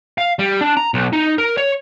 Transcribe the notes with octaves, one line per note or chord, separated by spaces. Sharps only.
F5
G3
D4
A#5
B1
D#4
A#4
C#5